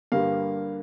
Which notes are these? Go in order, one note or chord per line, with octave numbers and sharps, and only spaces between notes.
G2 D3 G3 A#3 F5